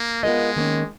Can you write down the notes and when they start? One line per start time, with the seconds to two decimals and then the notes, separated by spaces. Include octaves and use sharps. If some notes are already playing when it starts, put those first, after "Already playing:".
Already playing: A#3
0.23 G#3 B3 F4 A#4 D#5
0.56 D#3 A#3 C#4